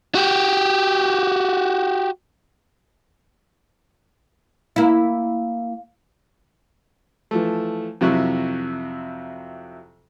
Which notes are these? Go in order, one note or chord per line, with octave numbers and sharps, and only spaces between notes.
F#4 G4
A#3 E4
E3 F3 A3
F2 C3 F#3 E4 C#6 F#6